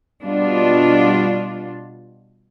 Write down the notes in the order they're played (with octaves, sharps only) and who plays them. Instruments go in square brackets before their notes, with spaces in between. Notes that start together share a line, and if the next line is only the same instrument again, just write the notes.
[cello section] B2 G3 D4 F4